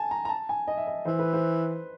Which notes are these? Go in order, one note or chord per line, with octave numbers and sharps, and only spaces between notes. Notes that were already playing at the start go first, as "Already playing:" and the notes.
Already playing: G#5 A5
A#5
A#5
A5
G#5
D#5
E5
D#5
E3 C5
B4
C5